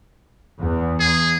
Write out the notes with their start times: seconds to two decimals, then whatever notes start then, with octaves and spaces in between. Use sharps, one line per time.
0.60 E2
1.00 G#4